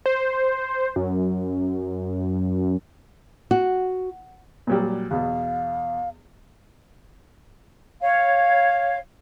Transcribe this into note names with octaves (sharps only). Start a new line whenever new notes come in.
C5
F#2
F#4
A#2 F#3 G3
E2 B2 F5
C#5 F5